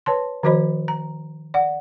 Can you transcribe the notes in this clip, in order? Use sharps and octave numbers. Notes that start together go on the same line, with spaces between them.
B4 C#5 A5 C6
D#3 F3 F#4 C5 D#5 B5
A#5
D5 F#5